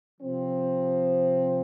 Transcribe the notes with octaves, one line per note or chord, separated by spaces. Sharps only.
C3 F3 C4